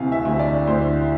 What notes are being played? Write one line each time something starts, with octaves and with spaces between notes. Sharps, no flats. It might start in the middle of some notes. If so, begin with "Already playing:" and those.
Already playing: D2 C3 E3 F5 G#5
E5
D2
D5
D2 C5